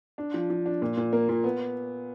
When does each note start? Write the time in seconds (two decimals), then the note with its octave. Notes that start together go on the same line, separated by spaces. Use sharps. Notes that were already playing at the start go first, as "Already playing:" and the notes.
0.18 D4
0.34 F3
0.50 F3
0.66 D4
0.82 A#2
0.97 A#2
1.13 A#3
1.29 A#2
1.44 B3